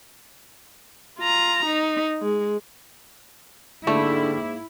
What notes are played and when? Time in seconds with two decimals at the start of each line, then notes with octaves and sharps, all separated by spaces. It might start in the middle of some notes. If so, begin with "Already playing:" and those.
1.19 F4 A#5
1.66 D#4
2.21 G#3
3.87 G#2 D3 G3 A3 A#3 E4